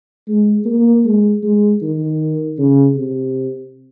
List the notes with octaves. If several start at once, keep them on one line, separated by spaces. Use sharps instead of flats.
G#3
A#3
G#3
G#3
D#3
C#3
C3